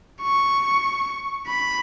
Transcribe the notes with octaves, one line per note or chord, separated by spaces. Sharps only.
C#6
B5